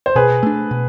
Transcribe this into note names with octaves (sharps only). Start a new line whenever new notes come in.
C5
B2 G#4 B4
A3 D4
B2